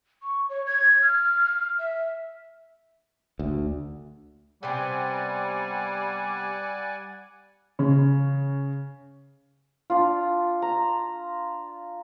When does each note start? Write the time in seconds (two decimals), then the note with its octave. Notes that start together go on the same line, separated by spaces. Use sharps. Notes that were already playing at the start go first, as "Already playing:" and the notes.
0.23 C#6
0.49 C#5
0.66 G#6
1.02 F6
1.79 E5
3.39 D2
4.63 C3 G3 B3 C4 D5 F#5 G#5
7.79 C#3
9.90 D4 F4
10.62 A#5